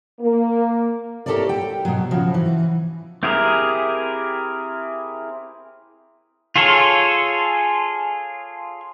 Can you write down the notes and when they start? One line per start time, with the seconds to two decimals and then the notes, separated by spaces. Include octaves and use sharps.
0.21 A#3
1.26 E4 G4 A4 A#4 C#5 D5
1.49 G5
1.85 B2 F#3
2.11 C#3 F3 F#4
2.34 E3
3.23 C4 E4 G4 G#4 A#4
6.56 F4 G#4 A4 C#5